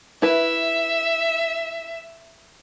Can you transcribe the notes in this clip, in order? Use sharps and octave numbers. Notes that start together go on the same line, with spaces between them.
E4 B4 E5